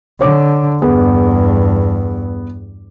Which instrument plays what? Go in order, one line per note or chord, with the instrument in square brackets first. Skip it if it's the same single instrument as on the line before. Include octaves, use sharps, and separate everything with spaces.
[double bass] D3 [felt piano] C#5 D6
[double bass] E2 G2 [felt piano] B3 G#4